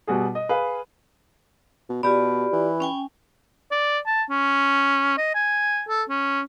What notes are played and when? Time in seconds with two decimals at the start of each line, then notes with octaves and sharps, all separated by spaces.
0.07 B2 G3 F#4 G#4
0.35 D#5
0.49 G#4 B4 F5
1.89 B2
2.03 B2 F4 G4 D5 B5
2.53 E3
2.80 C#4 G5 G#5
3.71 D5
4.06 A5
4.29 C#4
5.17 D#5
5.35 G#5
5.89 A4
6.09 C#4